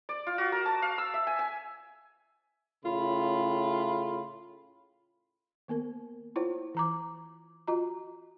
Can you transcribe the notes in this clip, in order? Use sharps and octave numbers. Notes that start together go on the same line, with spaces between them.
D5
F4
F#4
A#4
A5
F5
E6
E5
G#5
G#5
A2 C#3 F4 B5
D#3 A#3 B3 A#4
E4 F4 C5 C#5
E3 A#5 D6
F4 F#4 D#5 A#5